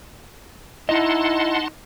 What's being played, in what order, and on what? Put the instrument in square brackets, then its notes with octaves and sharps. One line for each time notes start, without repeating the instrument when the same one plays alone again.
[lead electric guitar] D#4 D#5 [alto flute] E4 [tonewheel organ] F#5 A5 C6